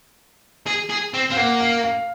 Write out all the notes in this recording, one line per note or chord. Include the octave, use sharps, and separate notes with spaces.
G#4
G#4
C4
C4 F5
A#3 F#5
F5
F5